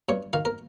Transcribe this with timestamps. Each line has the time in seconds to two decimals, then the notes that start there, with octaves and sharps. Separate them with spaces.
0.09 G2 C#5
0.33 D#3 F5
0.45 A#4